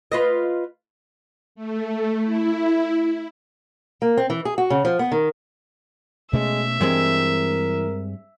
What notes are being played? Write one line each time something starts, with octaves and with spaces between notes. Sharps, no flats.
F4 B4 D#5
A3
E4
A#3
C4
E3
G#4
F#4
C#3
F3
B3
D#3
B2 G#3 A3 C#4 E5
G2 E3 G#3 C4 A#4